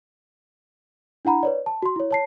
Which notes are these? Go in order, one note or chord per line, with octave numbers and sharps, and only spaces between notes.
D4 E4 F#5 A#5 B5
B4 C#5 D5
A5
F#4 C6
E4 C#5
C#5 A5 C7